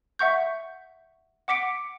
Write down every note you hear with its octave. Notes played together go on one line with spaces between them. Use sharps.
E5 F#5 C#6 G6
F#5 D6 B6 C#7 D7